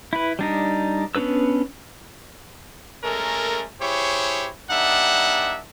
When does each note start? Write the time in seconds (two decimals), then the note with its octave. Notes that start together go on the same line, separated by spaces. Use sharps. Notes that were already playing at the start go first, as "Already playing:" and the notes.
0.13 E4 B4
0.39 G3 D4 D#4
1.15 B3 C#4 D4 B4 E6
3.04 G#3 A3 C#4 A4 A#4
3.81 E4 G4 G#4 C5 C#5
4.71 G3 A#3 D4 D#4 E5 F#5